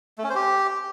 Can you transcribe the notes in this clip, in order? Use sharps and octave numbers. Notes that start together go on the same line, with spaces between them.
A3
C#4
C5
G4